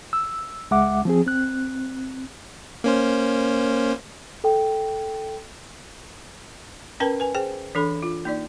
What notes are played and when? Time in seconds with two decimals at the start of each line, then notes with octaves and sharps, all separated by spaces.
0.13 E6
0.71 C#2 G#3 E5 F#5 D6
1.05 F3 C4 G#4
1.26 C4 F#6
2.84 A#3 C#4 C5
4.44 A4 G5
7.00 C#4 A#4 B4 G5 A5
7.20 B4 G#5
7.35 G#4 C5 G5
7.75 E3 D4 A4 B5
8.03 F4
8.25 A#3 D#4 D5